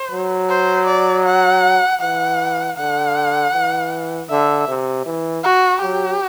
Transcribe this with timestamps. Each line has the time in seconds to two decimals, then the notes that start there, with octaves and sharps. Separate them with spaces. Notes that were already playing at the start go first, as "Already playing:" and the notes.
Already playing: C5
0.11 F#3
0.49 C5
0.87 D5
1.26 F#5
2.01 E3 F#5
2.77 D3 F#5
3.54 E3
4.29 D3 E5
4.68 C3
5.06 E3
5.43 F#4
5.82 F#3 G4